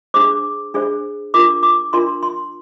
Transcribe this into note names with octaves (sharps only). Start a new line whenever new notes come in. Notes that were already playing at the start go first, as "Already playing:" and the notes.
D4 G#4 C5 D6
D4 G#4 C5
D4 F4 A#4 D6
D6
D4 F4 A#4 C6
C6